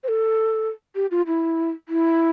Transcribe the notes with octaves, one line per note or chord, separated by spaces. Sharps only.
C5
A4
G4
F4
E4
E4